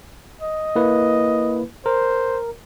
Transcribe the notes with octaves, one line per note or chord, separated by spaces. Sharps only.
D#5
A#3 E4 B4
A#4 C5